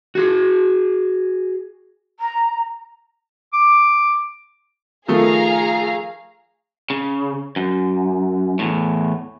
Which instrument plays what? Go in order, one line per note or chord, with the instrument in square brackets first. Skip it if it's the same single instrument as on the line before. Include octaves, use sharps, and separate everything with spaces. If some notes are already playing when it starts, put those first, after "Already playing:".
[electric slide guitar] F#4 G#4
[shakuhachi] A#5
[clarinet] D6
[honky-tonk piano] D#3 F3 A3 [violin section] G#4 F5 A#5
[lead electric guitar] C#3
F#2
E2 A2